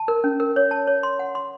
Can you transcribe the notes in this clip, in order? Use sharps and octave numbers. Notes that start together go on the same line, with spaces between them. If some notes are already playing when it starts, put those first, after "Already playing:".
Already playing: A5
A#4
C#4
A#4
C#5
A5
C#5
C6
F#5
C6